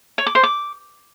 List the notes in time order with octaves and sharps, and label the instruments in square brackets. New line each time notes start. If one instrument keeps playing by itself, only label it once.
[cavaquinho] C#5
D6
C5
D6